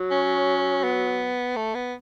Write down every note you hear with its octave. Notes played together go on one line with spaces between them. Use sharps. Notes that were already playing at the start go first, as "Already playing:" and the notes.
Already playing: F#3
C#4
B3
A3
B3